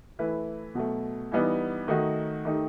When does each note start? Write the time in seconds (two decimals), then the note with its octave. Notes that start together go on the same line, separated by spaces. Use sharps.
0.19 E3 A3 E4 B4
0.75 B2 F#3 A3
1.32 E3 G3 B3 D#4
1.88 D#3 A3 D#4 F#4
2.45 D#3 A3 D#4 G4